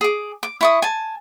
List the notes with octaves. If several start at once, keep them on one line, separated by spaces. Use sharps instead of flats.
G#4 D6
D6
E4 C#6 D#6
G#5 A5